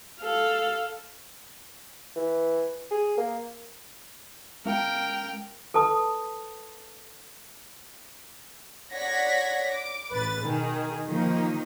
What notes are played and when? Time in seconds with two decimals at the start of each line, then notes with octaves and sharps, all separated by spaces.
0.20 A4 F5
2.16 E3
2.91 G#4
3.18 A#3
4.66 G#3 C#4 A#4 F5 G5
5.74 A4 B4 A5 D#6
8.94 C#5 D5 F#5 G#6 A#6 B6
9.71 D6
10.12 A1 B4 A6
10.44 B2 D#3 G#4
11.07 D#3 F3 A#3 D#4